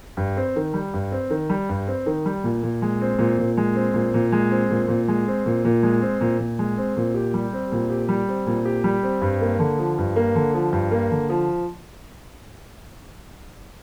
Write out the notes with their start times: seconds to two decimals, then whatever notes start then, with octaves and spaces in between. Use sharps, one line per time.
0.17 G2
0.36 C4
0.56 D#3
0.74 G3
0.94 G2
1.12 C4
1.30 D#3
1.50 G3
1.69 G2
1.87 C4
2.06 D#3
2.26 G3
2.44 A#2
2.63 A#2
2.82 G#3
3.01 C4
3.19 A#2
3.38 A#2
3.57 G#3
3.75 C4
3.94 A#2
4.14 A#2
4.32 G#3
4.50 C4
4.70 A#2
4.88 A#2
5.08 G#3
5.27 C4
5.46 A#2
5.65 A#2
5.83 G#3
6.01 C4
6.21 A#2
6.39 A#2
6.59 G#3
6.77 C4
6.97 A#2
7.14 G4
7.34 G3
7.53 C4
7.72 A#2
7.90 G4
8.09 G3
8.28 C4
8.46 A#2
8.65 G4
8.84 G3
9.03 C4
9.22 G2
9.41 A#3
9.59 D3
9.79 F3
9.98 G2
10.16 A#3
10.36 D3
10.54 F3
10.73 G2
10.91 A#3
11.11 D3
11.29 F3